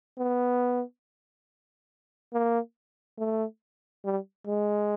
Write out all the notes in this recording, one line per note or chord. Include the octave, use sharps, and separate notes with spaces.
B3
A#3
A3
G3
G#3